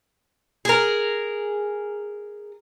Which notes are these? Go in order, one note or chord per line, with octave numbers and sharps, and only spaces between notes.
G#4 A#4